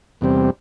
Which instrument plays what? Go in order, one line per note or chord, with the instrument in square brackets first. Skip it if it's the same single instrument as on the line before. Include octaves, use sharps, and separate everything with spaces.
[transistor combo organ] E2 C3 G3 C4